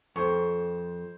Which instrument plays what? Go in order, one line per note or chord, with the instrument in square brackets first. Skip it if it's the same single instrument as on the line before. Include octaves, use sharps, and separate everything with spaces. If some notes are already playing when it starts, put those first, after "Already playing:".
[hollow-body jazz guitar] F2 [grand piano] C5 C#6